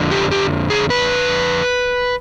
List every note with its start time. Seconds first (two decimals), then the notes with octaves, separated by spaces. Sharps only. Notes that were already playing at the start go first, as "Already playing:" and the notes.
Already playing: F2 D3 F3
0.11 G4
0.31 G4
0.70 G#4
0.90 B4